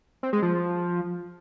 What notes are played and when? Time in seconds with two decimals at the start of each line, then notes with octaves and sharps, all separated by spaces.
0.23 C4
0.33 G#3
0.42 F3